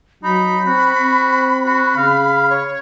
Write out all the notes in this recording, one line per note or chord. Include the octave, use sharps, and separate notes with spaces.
F#3 D#4 B5
C4 F#4
C4
F#4
C#3 F5
C#5